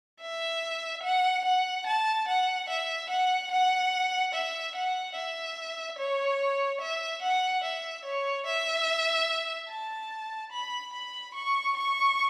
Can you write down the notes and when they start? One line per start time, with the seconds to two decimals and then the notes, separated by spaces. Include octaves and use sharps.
0.21 E5
1.03 F#5
1.45 F#5
1.86 A5
2.28 F#5
2.69 E5
3.10 F#5
3.51 F#5
4.34 E5
4.75 F#5
5.15 E5
5.98 C#5
6.81 E5
7.22 F#5
7.63 E5
8.05 C#5
8.46 E5
9.70 A5
10.52 B5
10.93 B5
11.34 C#6
11.76 C#6